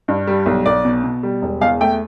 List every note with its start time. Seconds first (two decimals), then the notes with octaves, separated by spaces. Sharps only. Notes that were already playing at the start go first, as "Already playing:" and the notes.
0.08 G2
0.27 G3
0.46 B1
0.66 B1 D5
0.85 B2
1.04 B2
1.23 G3
1.42 E1
1.61 E2 F5
1.80 A3 G5